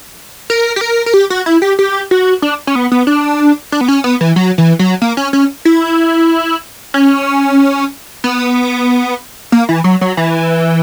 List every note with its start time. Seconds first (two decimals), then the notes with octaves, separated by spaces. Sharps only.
0.50 A#4
0.76 G4
0.81 A#4
1.06 A#4
1.14 G4
1.30 F#4
1.46 E4
1.62 G4
1.79 G4
2.11 F#4
2.42 D4
2.67 C#4
2.75 B3
2.92 B3
3.07 D4
3.72 D4
3.81 B3
3.88 C#4
4.04 B3
4.21 E3
4.36 F#3
4.58 E3
4.79 F#3
5.02 A#3
5.17 C#4
5.33 C#4
5.65 E4
6.94 C#4
8.24 B3
9.52 A#3
9.69 E3
9.84 F#3
10.01 F#3
10.17 E3